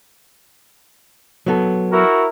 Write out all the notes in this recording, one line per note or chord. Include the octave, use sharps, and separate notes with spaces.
F#3 B3 A4
E4 F#4 A#4